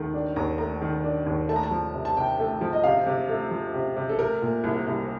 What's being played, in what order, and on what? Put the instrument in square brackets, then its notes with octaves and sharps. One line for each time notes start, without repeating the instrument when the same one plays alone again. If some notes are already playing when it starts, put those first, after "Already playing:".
Already playing: [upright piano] D#2 D#3 A3
D4
[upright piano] D#2 [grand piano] A#5
[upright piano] A3 [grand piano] A#5
[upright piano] D#3
D4
D#2
[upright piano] A3 [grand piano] A5
[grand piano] A#5
A5
[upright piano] F3
C3
[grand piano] A5
[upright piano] C3 [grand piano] G5
[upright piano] A3
F3
[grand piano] D#5
[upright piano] C3 [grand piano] F5
[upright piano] C3
A3
F3
C3
C3
[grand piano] A4
[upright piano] A3 [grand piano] A#4
[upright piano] A#2
C2
C2